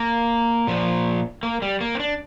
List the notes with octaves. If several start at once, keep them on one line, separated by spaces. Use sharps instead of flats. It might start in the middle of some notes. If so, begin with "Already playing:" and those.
Already playing: A#3
A#2 F3
A#3
G3
A#3
C4
D4